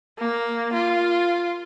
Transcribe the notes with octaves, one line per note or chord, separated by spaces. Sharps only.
A#3
F4